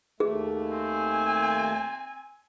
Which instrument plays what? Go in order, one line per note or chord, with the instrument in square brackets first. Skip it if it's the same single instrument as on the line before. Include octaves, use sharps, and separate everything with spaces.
[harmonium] D#2 A3 [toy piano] G#4
[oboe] C4 [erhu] G#5